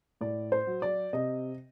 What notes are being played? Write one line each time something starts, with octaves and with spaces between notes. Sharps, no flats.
A2 D5
C5
F#3
D5
C3 D#5